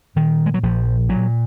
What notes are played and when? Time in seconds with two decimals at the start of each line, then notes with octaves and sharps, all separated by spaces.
0.16 A#2 D#3
0.46 G#3
0.54 F#3
0.63 A#1 F3
1.09 A#2 F#3